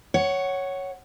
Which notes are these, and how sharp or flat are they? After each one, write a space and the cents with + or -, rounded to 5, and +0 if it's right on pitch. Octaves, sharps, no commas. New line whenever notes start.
C#5 +0 F#5 +15